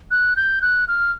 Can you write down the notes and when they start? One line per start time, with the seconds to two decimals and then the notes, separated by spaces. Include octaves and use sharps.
0.11 F#6
0.36 G6
0.62 F#6
0.88 F6